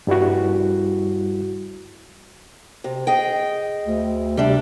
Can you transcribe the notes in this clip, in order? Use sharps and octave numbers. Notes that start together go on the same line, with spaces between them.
G2 G3 E4 F#4
C3
G#4 D#5 G5
D2
C3 G3 D4